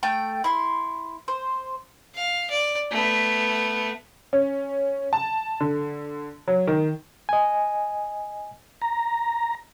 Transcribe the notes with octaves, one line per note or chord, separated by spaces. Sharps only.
A3 G5
E4 C6
C5
F5
D5
A3 B3
C#4
A5
D3
F#3
D#3
D#5 G#5
A#5